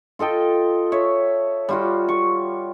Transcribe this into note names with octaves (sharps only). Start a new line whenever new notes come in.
F4 A4 D#5 G5
C#5 E5
G3 F4 F#4
C#6